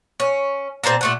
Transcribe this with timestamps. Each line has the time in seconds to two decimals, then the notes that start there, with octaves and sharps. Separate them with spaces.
0.20 C#4
0.84 A#2 C4 A5 A#5
1.01 A#2 A3 F#5